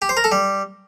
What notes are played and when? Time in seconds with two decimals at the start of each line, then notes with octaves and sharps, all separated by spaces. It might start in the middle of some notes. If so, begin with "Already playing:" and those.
0.02 G4
0.09 C5
0.17 A#4
0.24 A4
0.32 G3